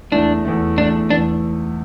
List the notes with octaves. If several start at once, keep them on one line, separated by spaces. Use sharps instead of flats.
E2 E3 A3 D4
E2 E3 A3
E2 E3 A3 D4
E2 E3 A3 D4